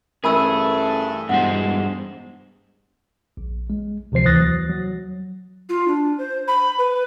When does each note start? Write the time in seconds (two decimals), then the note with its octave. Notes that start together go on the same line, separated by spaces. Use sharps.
0.24 A1 G2 A3 G#4 A#4 B5 E6
1.29 E1 G2 G#3 C5 F#5
3.37 A#1
3.70 G#3
4.12 C#2 C3 F3 C5 C7
4.25 D#2 E3 D#6 F#6 A6 A#6
4.40 F#3
4.70 F#3
5.69 F4
5.88 D4
6.18 C5
6.48 B5
6.78 B4